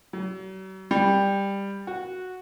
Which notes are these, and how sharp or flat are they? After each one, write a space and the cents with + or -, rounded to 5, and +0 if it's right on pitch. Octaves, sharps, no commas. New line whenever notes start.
F#3 +45
G3 +15
F#4 -5